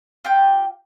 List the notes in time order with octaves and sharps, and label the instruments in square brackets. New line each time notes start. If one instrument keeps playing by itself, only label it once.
[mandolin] F4 G4 G5